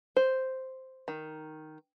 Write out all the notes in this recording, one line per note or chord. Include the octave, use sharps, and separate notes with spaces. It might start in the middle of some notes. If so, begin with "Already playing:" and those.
C5
D#3